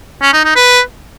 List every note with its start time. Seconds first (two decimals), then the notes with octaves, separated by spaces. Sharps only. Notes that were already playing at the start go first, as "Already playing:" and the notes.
0.22 C#4
0.33 D#4
0.44 D#4
0.56 B4